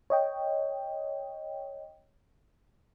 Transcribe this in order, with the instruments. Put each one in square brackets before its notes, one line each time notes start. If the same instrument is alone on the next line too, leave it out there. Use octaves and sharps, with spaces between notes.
[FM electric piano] C#5 D#5 G5